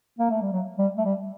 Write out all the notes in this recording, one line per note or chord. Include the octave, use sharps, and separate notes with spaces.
A#3
A3
G3
F#3
G3
A3
G3